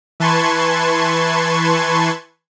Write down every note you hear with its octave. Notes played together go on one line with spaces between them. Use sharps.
E3 B4 A5 C6 C#6 G#6